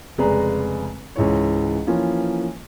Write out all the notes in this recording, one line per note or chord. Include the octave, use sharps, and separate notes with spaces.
F1 C#3 G#3 B4 D5 A#5
C#2 G#2 E3 C#5
E3 F3 A#3 C#4 F4